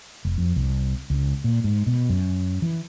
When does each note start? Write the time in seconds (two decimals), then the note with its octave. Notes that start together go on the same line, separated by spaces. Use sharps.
0.25 F1
0.38 F2
0.56 C2
1.10 C#2
1.44 A#2
1.64 G#2
1.87 B2
2.10 F#2
2.62 E3